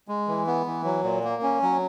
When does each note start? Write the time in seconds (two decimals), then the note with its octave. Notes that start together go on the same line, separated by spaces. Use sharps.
0.08 G#3
0.28 E3
0.47 B3
0.66 E3
0.84 F#3
1.03 A#2
1.24 A#3
1.43 C#4
1.62 F#3